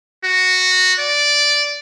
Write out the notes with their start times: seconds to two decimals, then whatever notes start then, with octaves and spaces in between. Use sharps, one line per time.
0.24 F#4
0.99 D5